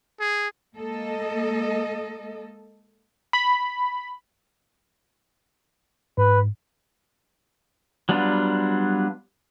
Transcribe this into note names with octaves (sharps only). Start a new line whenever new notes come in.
G#4
G#3 A#3 A4 D#5
B5
G#2 B4
F#3 G3 B3 D4 F4